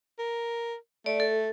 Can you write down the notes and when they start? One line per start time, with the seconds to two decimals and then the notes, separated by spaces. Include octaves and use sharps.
0.19 A#4
1.06 A3 D5
1.20 A4